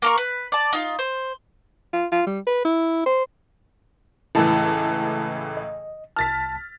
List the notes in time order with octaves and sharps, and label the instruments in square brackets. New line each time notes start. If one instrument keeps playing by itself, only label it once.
[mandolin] A#3 A#4 C#6
B4
D5 A5
D#4 F4
C5
[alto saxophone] F4
F4
G3
B4
E4
C5
[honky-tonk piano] C#2 A2 E3 [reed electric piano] E4 A5
[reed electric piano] D#5
[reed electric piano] C2 A5 [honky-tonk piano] F6 A6 B6